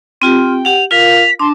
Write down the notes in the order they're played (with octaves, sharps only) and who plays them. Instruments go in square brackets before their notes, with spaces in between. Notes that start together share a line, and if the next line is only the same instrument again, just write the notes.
[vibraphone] C4 F4 G4 [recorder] G5
[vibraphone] G4 F#5 [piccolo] F7
[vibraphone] F4 A#4 F5 [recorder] B6 [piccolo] F7
[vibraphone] D4 [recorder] A5 [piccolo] C6